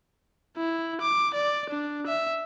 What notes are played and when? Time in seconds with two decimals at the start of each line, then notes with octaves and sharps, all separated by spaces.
0.57 E4
1.01 D6
1.35 D5
1.70 D4
2.07 E5